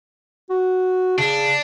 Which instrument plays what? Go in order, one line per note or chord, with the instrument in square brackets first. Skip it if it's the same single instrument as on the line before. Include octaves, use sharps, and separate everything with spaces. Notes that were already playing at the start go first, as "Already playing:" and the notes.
[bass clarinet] F#4
[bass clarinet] C#3 [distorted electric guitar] D4